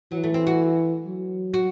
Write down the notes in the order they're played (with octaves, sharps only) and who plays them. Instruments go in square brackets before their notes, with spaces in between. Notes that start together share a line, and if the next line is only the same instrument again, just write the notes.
[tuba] E3 [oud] F#3
[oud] A3
C4
F#4
[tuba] F#3
[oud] F#4